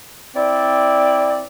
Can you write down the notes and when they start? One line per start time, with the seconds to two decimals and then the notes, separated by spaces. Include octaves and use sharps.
0.35 C4 E4 D5